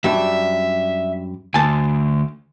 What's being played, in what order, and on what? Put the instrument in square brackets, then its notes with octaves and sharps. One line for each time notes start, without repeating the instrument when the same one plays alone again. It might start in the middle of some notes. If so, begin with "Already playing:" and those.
[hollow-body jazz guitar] F#2 G3 D4 [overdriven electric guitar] E5
[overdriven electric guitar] D2 [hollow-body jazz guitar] G#5 A5